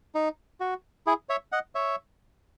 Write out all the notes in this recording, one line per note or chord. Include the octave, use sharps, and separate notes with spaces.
D#4
F#4
E4 G#4
C#5 E5
D#5 F#5
C#5 E5